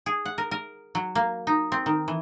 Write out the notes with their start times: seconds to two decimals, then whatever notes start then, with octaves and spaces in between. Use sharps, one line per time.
0.06 G#4
0.25 F#5
0.38 A#4
0.51 A#4
0.95 F#3
1.15 A#3
1.47 D#4
1.72 C4
1.86 D#3
2.08 E3